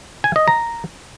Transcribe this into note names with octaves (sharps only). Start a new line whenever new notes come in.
G#5
D#5
A#5